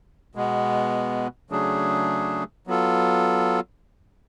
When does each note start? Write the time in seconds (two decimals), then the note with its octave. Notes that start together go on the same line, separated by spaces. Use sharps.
0.35 B2 G#3 B3
1.50 C#3 F#3 A3 D4 G#4
2.67 F#3 B3 F4 A4